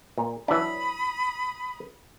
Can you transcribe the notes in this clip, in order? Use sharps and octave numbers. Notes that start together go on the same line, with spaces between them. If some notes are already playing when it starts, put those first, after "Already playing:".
A#2
E3 F#3 D4 B5 D#6